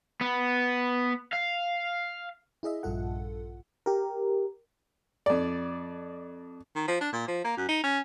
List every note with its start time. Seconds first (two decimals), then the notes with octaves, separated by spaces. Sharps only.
0.21 B3
1.33 F5
2.63 E4 G#4 D#5 E5
2.83 A#1 G2 F4 A4 F#5
3.86 G4 A#4
5.26 F2 D5
6.75 D#3
6.87 F3
7.01 D4
7.13 A#2
7.28 F3
7.44 A#3
7.57 F#2
7.69 D#4
7.83 C#4